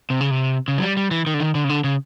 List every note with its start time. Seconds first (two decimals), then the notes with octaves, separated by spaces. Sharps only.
0.10 C3
0.21 C#3
0.31 C3
0.68 C#3
0.78 F#3
0.82 G3
0.97 G3
1.11 E3
1.27 D#3
1.34 D3
1.40 D#3
1.55 D3
1.64 C#3
1.69 D3
1.84 C#3